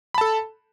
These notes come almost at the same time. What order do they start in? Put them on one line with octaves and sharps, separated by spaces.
B5 A5 A4